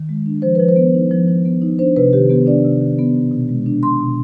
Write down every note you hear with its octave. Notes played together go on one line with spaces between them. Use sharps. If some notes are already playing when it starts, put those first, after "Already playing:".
Already playing: D#3
G#3
D4
F3 C5
F3 B4
C5
B3
D#4
F3
F3
B3
D#4
D4 C5
C3 B4
D#3 G4
B3 G4
D4 D5
C3
D#3
B3
B2
B2
G#3
D4
B2 C6
B2